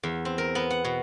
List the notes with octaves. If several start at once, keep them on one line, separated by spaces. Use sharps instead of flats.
E2
C4
A#4
B3
F#5
B2